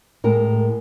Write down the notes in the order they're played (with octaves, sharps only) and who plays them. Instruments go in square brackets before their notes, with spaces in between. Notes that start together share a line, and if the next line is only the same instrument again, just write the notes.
[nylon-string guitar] A2 G#3 A#4